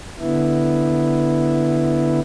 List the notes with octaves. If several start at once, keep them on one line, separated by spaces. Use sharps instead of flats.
D3 B3 E4